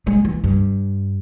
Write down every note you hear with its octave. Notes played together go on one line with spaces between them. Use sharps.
G#3
E3
G2